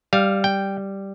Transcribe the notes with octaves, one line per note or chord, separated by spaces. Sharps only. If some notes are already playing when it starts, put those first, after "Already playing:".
G3 F5
G5